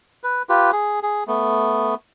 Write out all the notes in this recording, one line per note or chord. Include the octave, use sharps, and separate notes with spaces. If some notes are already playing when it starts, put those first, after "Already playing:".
B4
F4 G4 B4
G#4
G#4
A3 B3